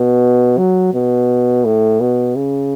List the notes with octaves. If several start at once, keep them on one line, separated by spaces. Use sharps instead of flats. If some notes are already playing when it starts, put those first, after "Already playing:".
Already playing: B2
F#3
B2
A2
B2
C#3